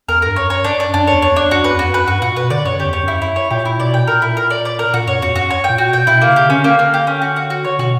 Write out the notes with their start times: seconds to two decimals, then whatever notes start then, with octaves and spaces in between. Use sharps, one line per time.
0.08 E2 A#4
0.22 G2 A#4
0.36 F#2 C#5
0.50 C#5
0.64 F#2 D4
0.80 D4
0.94 F#2 D4
1.07 C#5
1.13 E2
1.22 C#5
1.32 E2
1.36 D4
1.44 E2
1.51 F#2 F#4
1.64 B4
1.70 E2
1.79 F#4
1.89 F#2
1.94 B4
2.07 G2 F#4
2.22 A#2 F#4
2.36 B2 B4
2.50 D3 D5
2.65 F#2 C#5
2.80 E2 G4
2.93 C#5
3.03 F#2 E4
3.22 E4
3.36 C#5
3.50 A#2 G4
3.65 E4
3.79 B2 D5
3.94 G5
4.07 A#2 A#4
4.22 E4
4.37 A#4
4.50 D5
4.65 D5
4.79 A#4
4.93 A#2 F#4
5.07 F#2 C#5
5.22 E2 F#4
5.36 F#2 F#4
5.50 C#5
5.64 G5
5.69 A#2
5.78 F#4
5.89 B2 G5
6.07 B2 E4
6.21 A#3
6.27 C#3
6.36 G4
6.46 D3 C#4
6.64 A#3
6.79 A#3
6.94 G4
7.07 C#4
7.22 F#4
7.36 F#4
7.50 F#4
7.65 C#5
7.79 B2 F#4